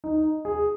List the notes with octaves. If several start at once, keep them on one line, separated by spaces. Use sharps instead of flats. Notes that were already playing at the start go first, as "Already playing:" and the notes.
D#4
G#4